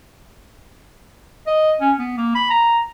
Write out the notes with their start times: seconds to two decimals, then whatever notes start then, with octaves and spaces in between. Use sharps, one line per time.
1.47 D#5
1.80 C#4
1.99 B3
2.17 A#3
2.35 B5
2.50 A#5